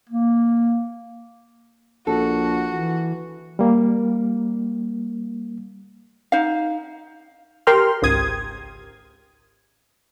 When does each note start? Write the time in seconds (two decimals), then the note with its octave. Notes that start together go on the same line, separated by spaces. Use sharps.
0.09 A#3
2.07 A#1 F#4 A4
2.72 E3
3.59 G3 A#3
6.32 D#4 F5
7.67 G4 A#4 G5 C6 F6
8.02 G#1 C#2 G#2 D#6 G#6